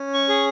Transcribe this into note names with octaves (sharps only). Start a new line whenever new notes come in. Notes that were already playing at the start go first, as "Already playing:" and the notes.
Already playing: C#4
C#6
G#4